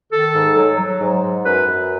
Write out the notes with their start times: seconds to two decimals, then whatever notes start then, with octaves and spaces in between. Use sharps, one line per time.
0.12 D#3 A4
0.35 G#2
0.57 F#3
0.78 F#3
1.01 G#2
1.23 G#2
1.45 F#2 B4
1.67 F#2